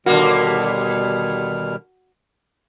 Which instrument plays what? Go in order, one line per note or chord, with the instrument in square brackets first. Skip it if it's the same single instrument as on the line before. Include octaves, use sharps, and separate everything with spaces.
[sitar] D#2 D3 A#3 [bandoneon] B2 G3 F6 [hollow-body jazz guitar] F#4